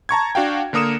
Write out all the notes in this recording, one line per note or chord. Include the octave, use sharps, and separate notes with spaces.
A5 A#5 C#6 G#6
D4 F#4 F5 G5
D3 A#3 A#4 D#6 C#7 E7